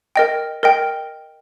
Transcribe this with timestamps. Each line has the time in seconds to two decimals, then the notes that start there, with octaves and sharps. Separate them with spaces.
0.16 A#4 D#5 G5
0.63 A#4 D#5 G5